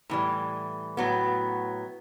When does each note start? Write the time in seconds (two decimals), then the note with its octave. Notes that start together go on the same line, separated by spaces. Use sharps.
0.10 A2 E3 G3
0.97 A2 F#3 B3